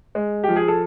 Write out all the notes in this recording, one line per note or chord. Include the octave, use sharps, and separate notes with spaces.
G#3
F3 G4
G#4
A4